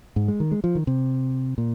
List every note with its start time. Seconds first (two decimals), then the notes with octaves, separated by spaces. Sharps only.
0.16 G#2
0.28 G#3
0.40 D#3
0.51 G#3
0.64 F3
0.75 D#3
0.87 C3
1.58 A#2